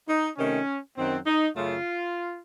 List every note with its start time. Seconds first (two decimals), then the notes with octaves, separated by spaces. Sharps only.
0.08 D#4
0.37 C3 D#3 A3 C#4
0.97 F#2 D#3 F#3 C4
1.27 D#4
1.56 F#2 C#3 A3 F4